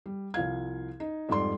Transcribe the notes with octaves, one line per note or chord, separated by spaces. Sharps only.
G3
C2 F3 F5 G#6
D#4
F2 G#2 G3 D5 C6